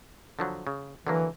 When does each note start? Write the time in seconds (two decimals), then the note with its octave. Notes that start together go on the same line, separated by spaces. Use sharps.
0.39 D3 F3 F#3
0.67 C#3
1.07 D3 E3 F#3 A#3